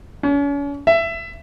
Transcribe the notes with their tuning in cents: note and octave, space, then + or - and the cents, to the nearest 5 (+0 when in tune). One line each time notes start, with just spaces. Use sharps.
C#4 +40
E5 +20